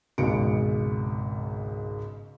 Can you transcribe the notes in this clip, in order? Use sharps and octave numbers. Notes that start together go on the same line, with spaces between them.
G#1 C#2 B2 G#3 C#7 D7